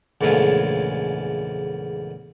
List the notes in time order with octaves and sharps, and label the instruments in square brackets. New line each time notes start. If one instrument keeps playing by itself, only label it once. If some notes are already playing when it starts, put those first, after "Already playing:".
[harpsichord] A#1 E2 G#2 C#3 A3 F4